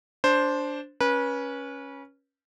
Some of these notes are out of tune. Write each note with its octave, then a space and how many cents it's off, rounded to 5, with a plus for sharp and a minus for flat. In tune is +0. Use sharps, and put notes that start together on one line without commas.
D4 -15 C5 +0
C#4 +0 B4 -30